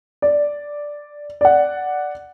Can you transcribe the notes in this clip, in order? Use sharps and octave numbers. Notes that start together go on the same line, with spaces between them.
D5
D5 F#5